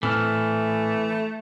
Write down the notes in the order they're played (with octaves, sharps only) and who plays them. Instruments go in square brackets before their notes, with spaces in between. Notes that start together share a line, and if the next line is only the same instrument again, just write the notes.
[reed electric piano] A2 C4 F6 [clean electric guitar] E3 [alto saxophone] A3